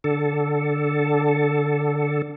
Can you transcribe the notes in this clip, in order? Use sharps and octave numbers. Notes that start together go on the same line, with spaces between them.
D3 A4